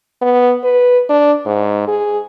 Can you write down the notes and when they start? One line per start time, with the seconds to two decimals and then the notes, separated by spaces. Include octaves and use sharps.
0.22 B3
0.64 B4
1.09 D4
1.46 G#2
1.88 G#4